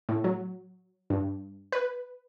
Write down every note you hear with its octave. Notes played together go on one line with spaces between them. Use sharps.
A2
F#3
G2
B4